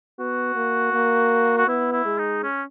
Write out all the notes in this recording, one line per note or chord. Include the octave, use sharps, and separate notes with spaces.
B3 F#4
A#3
A#3
F#4
B3 E4
E4
G#3
D#4
C#4